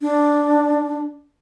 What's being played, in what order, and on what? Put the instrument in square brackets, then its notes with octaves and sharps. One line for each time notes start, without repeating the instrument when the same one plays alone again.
[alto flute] D4